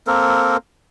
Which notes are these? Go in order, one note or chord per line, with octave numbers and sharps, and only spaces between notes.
A#3 C4 A4 A#4